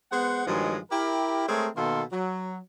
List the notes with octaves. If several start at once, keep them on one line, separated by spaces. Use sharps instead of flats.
G#3 B3 C5 F#5
G2 D#3 F3 F#3 G#3
E4 G4 A#4
G#3 A3 C4 G#4 A#4 C#5
B2 D#3 A#3 B3 A4 C6
F#3